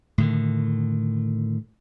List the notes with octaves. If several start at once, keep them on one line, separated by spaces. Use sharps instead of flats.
A2 D3 D#3